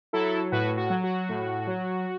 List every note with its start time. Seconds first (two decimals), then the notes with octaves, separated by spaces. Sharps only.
0.13 F#3 E4 A4
0.52 A2 F#4 B4
0.77 F#4
0.90 F#3
1.04 F#4
1.29 A2
1.67 F#3